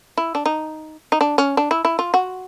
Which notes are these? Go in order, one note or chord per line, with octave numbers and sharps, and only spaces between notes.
E4
D4
D#4
D#4
D4
C#4
D4
E4
E4
F4
F#4